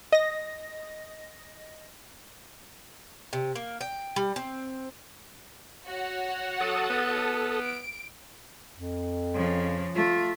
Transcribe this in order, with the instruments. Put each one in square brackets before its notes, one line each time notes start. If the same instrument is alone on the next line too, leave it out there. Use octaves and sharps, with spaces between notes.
[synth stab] D#5 A#6
[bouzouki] C3
A#3
G5
G3
C4
[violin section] F#4 C#5 F#5
[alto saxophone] F#3 [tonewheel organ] A4 A5 D#6
[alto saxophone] B3
[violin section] D7
[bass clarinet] F2
[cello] C#3 F3
[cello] A3 [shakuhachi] F4